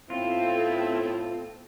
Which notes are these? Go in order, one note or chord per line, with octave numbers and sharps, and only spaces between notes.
A2 B3 C4 E4 F4 A4